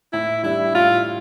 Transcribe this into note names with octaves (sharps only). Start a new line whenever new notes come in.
A2 E4
G3 D4 E4
A2 F4